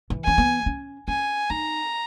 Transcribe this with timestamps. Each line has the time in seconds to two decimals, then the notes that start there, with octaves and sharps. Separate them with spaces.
0.10 E3
0.24 C#4 G#5
0.38 B3
0.66 C#4
1.08 C#4 G#5
1.50 D#4 A#5